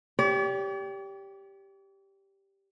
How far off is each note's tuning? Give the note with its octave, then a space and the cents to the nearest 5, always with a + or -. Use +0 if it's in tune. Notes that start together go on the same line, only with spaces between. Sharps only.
G4 +0 D5 -45